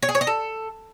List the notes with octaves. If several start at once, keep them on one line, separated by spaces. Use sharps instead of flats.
C#5
G#4
C#5
D#5
A4